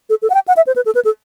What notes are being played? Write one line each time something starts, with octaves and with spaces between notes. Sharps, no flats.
A4
A4
F#5
G5
F#5
E5
C5
B4
A4
B4
A4